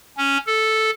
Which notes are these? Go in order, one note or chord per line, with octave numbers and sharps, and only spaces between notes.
C#4
A4